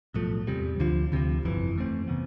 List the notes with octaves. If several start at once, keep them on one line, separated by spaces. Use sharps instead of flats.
B1 A2 F3 A3
E2 C3 G3
D2 D3 F3
D2 C3 F3
G1 F2 E3
F2 E3 A3 C4
C3 E3 B3